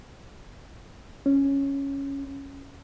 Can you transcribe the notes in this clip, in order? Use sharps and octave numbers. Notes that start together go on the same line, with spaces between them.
C#4